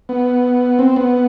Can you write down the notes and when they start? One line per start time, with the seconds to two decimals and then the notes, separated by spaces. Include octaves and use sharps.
0.09 B3
0.79 C4
0.96 B3